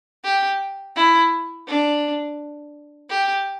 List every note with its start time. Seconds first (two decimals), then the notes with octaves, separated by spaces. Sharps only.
0.24 G4
0.96 E4
1.67 D4
3.10 G4